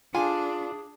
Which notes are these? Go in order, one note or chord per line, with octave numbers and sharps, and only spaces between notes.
D4 F4 G#4 G#5